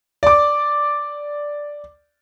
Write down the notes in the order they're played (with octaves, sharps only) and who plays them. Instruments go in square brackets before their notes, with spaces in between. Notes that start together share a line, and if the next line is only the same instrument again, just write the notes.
[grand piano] D5 D6